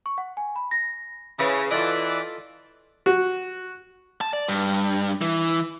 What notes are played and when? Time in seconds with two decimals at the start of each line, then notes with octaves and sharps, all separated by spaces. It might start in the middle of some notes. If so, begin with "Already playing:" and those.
0.06 C#6
0.18 F#5
0.37 G#5
0.56 B5
0.71 A#6
1.39 C#3 E4 G#4 B4
1.71 E3 F4 A4 D5 D#5
3.06 F#4
4.21 A5
4.33 D5
4.48 G2
5.21 E3